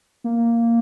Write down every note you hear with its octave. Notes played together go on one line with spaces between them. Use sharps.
A#3